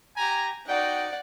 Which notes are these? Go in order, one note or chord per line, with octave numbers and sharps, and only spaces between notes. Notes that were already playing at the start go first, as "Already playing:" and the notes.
G4 G#5 A#5
D#4 F#4 D5 F#5 G5